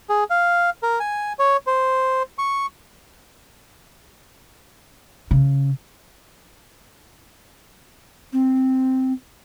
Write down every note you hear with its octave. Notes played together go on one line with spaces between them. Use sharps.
G#4
F5
A#4
G#5
C#5
C5
C#6
C#3
C4